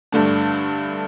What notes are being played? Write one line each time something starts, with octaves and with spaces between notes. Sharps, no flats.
G2 D3 A3 D4